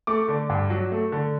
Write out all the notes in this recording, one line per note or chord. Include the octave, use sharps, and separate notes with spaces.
A3 D6
D3
G2
F#3
A3
D3